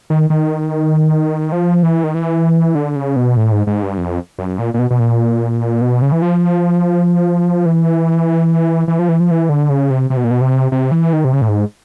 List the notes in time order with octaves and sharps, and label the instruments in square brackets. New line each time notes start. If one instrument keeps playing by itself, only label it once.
[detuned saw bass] D#3
D#3
F3
E3
D#3
E3
D3
C#3
B2
A2
G#2
G#2
G2
F2
F#2
A#2
A#2
B2
B2
A#2
B2
C#3
E3
F3
E3
E3
F3
E3
F3
E3
D3
C#3
C3
C3
B2
A#2
B2
C3
C3
E3
D#3
C3
C#3
A2
G#2